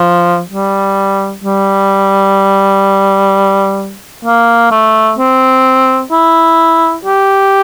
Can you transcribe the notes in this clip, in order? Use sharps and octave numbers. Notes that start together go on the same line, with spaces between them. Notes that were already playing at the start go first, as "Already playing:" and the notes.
Already playing: F3
G3
G3
A#3
A3
C4
E4
G4